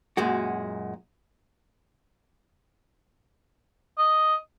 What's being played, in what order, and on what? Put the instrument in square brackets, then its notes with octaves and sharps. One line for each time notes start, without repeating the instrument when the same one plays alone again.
[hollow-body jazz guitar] F#2 A#2 G#3 F#4
[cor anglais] D#5